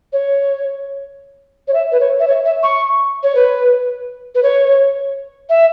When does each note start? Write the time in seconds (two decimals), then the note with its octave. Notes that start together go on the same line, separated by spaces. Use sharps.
0.13 C#5
1.68 C#5
1.74 E5
1.92 B4
2.00 C#5
2.20 E5
2.27 C#5
2.45 E5
2.63 C#6
3.23 C#5
3.35 B4
4.35 B4
4.43 C#5
5.49 E5